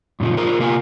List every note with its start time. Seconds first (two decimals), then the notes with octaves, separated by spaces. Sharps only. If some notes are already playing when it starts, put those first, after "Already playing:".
0.20 F#2 A#2 C#3 F3
0.37 F4 G#4 A#4 C5
0.59 C3 A#3 F4 C5 G#5